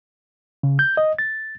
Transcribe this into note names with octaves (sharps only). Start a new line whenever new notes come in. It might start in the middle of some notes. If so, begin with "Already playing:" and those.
C#3
G6
D#5
A6